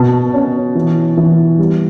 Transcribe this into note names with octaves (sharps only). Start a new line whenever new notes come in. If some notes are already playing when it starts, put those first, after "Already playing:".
Already playing: B2 A5
C#4
E3
E3
G3